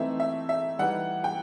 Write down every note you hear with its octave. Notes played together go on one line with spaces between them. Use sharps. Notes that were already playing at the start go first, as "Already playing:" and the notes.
Already playing: E3 A3 C4 D#4 E5
E5
E5
E3 G3 D#4 F#5
G5